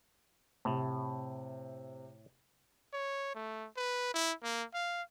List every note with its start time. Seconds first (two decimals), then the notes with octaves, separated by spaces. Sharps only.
0.65 A2 C3
2.93 C#5
3.35 A3
3.77 B4
4.14 E4
4.43 A#3
4.74 F5